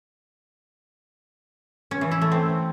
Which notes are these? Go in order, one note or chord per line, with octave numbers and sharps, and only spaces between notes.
C#4
E3
E4
A3
C4